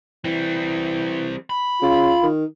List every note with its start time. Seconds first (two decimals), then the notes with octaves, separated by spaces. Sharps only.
0.25 E3 G3 C4
1.50 B5
1.82 C#3 F4
2.23 D#3